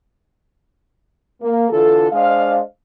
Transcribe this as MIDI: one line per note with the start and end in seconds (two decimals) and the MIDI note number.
1.41 1.69 58
1.70 2.07 50
1.70 2.07 52
1.70 2.07 64
1.70 2.07 65
1.70 2.07 69
2.12 2.59 56
2.12 2.59 62
2.12 2.59 72
2.12 2.59 75
2.12 2.59 77